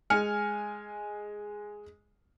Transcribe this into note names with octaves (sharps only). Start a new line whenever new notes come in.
G#3 G#5 F6 C#7